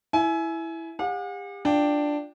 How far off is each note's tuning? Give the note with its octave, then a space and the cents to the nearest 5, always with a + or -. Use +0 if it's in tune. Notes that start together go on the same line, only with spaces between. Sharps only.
E4 +0 G#5 +25
G4 +40 F#5 -45
D4 +5 F4 +0 G5 +0